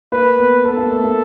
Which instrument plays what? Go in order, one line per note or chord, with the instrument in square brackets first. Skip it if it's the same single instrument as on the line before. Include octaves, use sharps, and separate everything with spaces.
[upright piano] A#3 [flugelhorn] B4
[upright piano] B3
[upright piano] B3 [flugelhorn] A4
[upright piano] A#3
A3
A#3